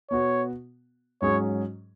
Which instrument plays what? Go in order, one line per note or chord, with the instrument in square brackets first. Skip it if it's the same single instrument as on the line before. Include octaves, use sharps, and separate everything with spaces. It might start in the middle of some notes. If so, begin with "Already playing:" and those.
[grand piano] B2 B3 F#4 [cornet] C#5
[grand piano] G#2 F#3 C#4 G#4 [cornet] C#5